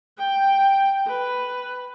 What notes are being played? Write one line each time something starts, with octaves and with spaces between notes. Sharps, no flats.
G5
B4